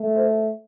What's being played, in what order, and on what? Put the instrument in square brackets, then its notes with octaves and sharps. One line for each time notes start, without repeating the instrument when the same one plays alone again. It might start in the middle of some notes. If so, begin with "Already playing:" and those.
Already playing: [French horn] A3
[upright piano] C5